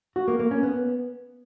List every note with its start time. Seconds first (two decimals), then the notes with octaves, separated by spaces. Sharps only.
0.16 F#4
0.28 A#3
0.39 A#3
0.51 C#4
0.63 B3